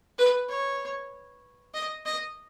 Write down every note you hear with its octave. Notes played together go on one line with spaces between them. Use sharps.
B4
C#5
D#5
D#5